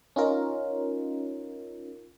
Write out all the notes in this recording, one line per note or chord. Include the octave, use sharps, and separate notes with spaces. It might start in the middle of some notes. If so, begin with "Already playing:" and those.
C#4 D#4 F4 A#4